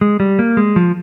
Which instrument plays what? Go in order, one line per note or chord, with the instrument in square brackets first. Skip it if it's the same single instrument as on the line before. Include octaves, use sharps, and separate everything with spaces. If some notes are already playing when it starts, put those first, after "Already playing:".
[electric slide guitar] G#3
G3
A#3
G#3
F3